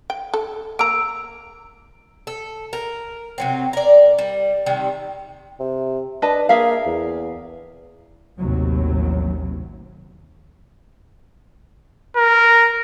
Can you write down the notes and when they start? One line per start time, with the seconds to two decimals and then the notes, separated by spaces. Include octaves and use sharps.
0.10 G5
0.34 A4
0.79 A#3 A#5 E6 D7
2.27 A4
2.73 A#4
3.38 C3 F#3 C4
3.73 A#4 D5
4.18 G3
4.66 C3 D#3 G3
5.60 C3
6.22 D4 B4 D#5 A5
6.49 A#3 G#4 E5 F5
6.86 E2
8.39 A1 D#2 C3 F#3
12.17 A#4